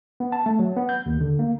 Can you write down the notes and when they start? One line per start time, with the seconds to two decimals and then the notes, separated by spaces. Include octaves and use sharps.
0.20 B3
0.32 A5
0.46 A3
0.59 F#3
0.76 B3
0.89 G6
1.06 D#2
1.21 D3
1.39 A#3